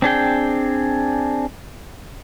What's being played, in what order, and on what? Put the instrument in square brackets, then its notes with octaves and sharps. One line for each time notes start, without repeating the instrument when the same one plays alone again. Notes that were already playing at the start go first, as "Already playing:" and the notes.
[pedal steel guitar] C4 D4 G#4 G5